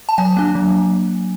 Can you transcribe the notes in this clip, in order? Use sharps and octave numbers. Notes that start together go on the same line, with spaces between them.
A5
F#3 G#5
A#3 D4
F#3